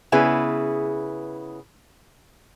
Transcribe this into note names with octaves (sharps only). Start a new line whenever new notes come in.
C#3 B3 E4 G#4 B4